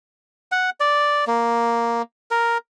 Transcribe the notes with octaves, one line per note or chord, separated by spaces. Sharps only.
F#5
D5
A#3
A#4